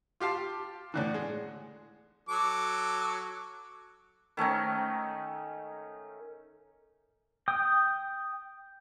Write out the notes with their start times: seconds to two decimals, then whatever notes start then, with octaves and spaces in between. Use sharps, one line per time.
0.20 F4 G4 F5 A5 C6
0.94 A2 D3 E3
1.14 G#3
2.29 F#3 A4 D6
4.37 D#3 A3 C#4 D#4
7.48 G5 D#6